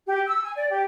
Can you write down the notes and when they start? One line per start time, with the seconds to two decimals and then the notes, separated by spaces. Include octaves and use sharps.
0.07 G4
0.27 E6
0.42 G#5
0.56 D5
0.70 G4